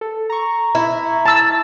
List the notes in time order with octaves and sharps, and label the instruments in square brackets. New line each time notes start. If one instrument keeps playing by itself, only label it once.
[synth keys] A4
A#5 C#6
[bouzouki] E4
[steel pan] A5 E6